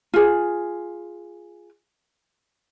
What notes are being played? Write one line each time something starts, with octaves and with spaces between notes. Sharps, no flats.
F4 G#4